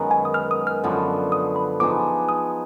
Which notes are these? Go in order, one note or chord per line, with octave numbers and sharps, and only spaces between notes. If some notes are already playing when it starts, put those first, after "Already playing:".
Already playing: F#2 D#3 G#3 B3
G#5
D#6
F6
D#6
F6
F#2 D3 F3 B3
D#6
B5
F3 B3 D#4 G#4 D6
D#6